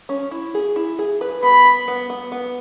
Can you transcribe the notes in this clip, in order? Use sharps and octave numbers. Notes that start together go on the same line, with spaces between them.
C#4
E4
G#4
E4
G#4
B4
B3 B5
B3
B3
B3
B3